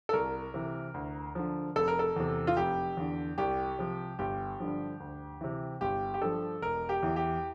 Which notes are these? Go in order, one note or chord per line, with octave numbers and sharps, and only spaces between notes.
A4
C2 A#4
C3 E3
D2
D3 F3
F1 A4
A#4
A4
E2 C3
F4
F1 G4
E2 D3
C2 G4
C3 F3
G1 G4
G2 D3 F3
D2
C3 E3
G1 G4
G4
G2 F3 A4
E1 A#4
G4
E2 E3
G4